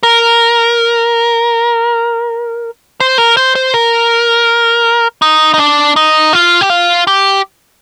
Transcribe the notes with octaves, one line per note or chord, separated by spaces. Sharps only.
A#4
C5
A#4
C5
C5
A#4
D#4
D#4
D4
D#4
F4
G4
F4
G4